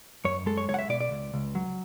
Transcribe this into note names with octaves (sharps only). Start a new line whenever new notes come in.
F#2 C#5
G#3 A4
C#5
C#2 C#5
F#5
E5
B2 D5
D5
C#2
C#2
F#3